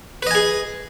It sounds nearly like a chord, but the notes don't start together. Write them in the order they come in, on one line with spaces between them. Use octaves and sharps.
B4 D#5 G#5 G#4